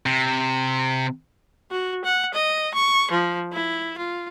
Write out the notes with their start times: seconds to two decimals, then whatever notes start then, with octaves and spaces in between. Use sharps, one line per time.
0.06 C3
1.71 F#4
2.05 F#5
2.34 D#5
2.74 C#6
3.11 F3
3.53 E4
3.98 F4